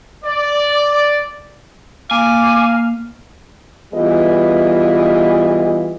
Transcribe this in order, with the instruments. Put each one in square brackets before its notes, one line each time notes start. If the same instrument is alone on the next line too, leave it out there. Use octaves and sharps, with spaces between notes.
[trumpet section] D5
[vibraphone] A#3 [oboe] F5 [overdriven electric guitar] G#5 [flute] D6
[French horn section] E3 G3 B3 F4 G#4 D#5